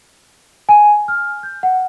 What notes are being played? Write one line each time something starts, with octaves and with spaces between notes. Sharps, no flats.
G#5
F6
G6
F#5